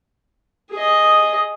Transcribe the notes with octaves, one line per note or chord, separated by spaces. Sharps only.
G#4 D#5